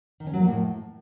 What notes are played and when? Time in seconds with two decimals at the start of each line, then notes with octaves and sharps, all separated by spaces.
0.20 D#3
0.27 C#4
0.33 F#3
0.40 A#3
0.47 A2